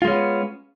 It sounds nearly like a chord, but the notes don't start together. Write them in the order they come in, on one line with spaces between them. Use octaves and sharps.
F4 G#3 C#4 B3